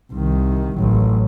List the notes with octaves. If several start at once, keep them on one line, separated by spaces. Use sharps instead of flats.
C2 D#3
A1 F#3